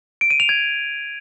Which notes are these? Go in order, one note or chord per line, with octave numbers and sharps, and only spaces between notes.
D7
D#7
F7
G#6